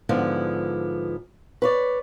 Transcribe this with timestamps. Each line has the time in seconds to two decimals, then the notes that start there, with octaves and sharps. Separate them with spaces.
0.09 G#2 D3 F3 B3 E4
1.62 B4 C#5 D5